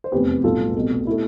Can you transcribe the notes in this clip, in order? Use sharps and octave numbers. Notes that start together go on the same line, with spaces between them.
C5
F1 E2 C3 G4 B4
B1 A2 G3 F4 A4
C2 B2 A3
B2 A3 E4